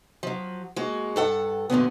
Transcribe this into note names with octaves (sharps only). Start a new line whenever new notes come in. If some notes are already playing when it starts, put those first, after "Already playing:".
F3 F#3
G#3 A#3 F#4
G2 A4 F#5
F#2 A#2 D3 B3